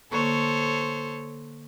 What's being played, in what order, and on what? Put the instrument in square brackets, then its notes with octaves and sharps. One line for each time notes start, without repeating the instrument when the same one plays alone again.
[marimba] D3 A#3 C#6 [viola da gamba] A4 C5 C#5